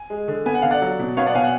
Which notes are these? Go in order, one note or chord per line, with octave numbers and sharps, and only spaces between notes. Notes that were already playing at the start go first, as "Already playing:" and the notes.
Already playing: G#5
G#3
D3
B3 G#5
F#5
D3 F5
D5 F#5
F#3
B2
B3 C#5 F5
D5 F#5
B2 F5 G#5
F#5